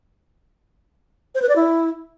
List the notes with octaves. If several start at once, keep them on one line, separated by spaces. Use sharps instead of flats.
C5
B4
D5
E4